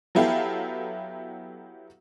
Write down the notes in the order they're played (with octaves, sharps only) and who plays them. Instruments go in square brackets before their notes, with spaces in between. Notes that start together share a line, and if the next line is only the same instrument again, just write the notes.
[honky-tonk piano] F#3 B3 E4 G4 A4 F5